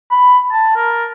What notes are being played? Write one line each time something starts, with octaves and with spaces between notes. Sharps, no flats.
B5
A5
A#4